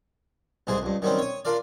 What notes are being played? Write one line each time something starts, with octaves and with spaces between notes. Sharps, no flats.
C2 G#2 E3 G#4 C5
C#2 G2
D#3 F#3 G3 C4 C#4
C#5 D#6
D4 F4 A#4 D5